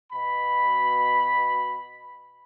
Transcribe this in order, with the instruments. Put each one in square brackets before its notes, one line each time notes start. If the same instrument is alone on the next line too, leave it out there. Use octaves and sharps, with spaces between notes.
[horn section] B2 B5